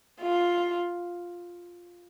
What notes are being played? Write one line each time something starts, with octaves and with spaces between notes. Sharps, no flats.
F4